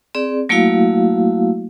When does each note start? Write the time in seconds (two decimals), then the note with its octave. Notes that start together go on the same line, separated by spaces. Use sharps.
0.15 C4 G#4 D5
0.49 F#3 A3 A#3 E4 F#4 F5